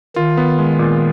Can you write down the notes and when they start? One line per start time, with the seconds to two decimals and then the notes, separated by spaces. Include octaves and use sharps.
0.16 D#3 F4
0.37 B3
0.59 G#3
0.79 A#2